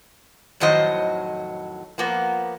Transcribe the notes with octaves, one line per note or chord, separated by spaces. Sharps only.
F2 A2 D#3 F#3 C5 D#5
F3 A#3 B3